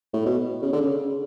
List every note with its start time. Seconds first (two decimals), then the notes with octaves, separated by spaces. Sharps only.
0.13 A2
0.26 B2
0.62 C#3
0.72 D3
0.81 C#3